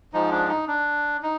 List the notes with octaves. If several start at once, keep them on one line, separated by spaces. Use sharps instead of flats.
G#2 F3 G#3 D#4
D4
D#4
D4
D#4